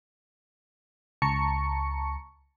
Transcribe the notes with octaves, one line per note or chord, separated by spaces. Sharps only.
C#2 A5 A#5 C#6 C#7